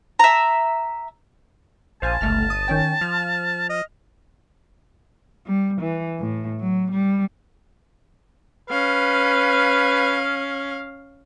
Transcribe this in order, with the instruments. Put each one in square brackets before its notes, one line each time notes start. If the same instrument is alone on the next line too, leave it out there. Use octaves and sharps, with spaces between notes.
[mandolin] E5 A#5
[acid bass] A#1 [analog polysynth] C5 F5 G#5 [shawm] A5
[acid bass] G1 [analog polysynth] C#2 A3 F6
[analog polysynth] D#6
D#3 C#4 G5
[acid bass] F3 [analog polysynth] F6
[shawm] D#5
[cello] G3
E3
A2
F#3
G3
[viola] C#4 F5 [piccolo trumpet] B4